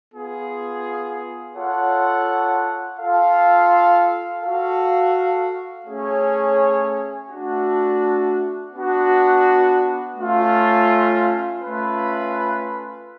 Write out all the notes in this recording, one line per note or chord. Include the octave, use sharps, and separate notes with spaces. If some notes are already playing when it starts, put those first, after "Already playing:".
B3 F4 G#4
F4 A4 C#5 F#5
F4 A4 F5
F#4 A4 F5
A3 C#4 G#4 C#5
A3 D4 F#4
B3 D4 F#4
A3 C#4 F4
A3 C#4 F4 B4